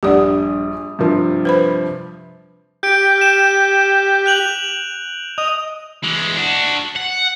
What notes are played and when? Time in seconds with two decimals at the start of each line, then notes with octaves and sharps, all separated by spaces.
0.03 A#1 G2 G4 D5 F#5 D#6
0.99 G2 C3 F3
1.45 B4 C5 B5
2.83 G4 G6 D7
3.18 F6 E7
4.26 F#6 F7 F#7
5.38 D#5 F7
6.03 E3 G#3
6.36 D4 F#4
6.96 F#5